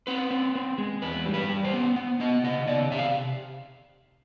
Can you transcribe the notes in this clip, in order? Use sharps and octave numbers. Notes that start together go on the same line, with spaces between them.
C4 B4
C4
C4
G#3
E2 B4
G3
B4
G3
C5
B3
B3
B3 D#5
C#3 D#5
C#3 D5
C3 E5
F5